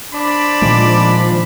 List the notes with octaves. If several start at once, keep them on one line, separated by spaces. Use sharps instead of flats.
D4 C5 D5 B5
A#2 D#3 F3 G#3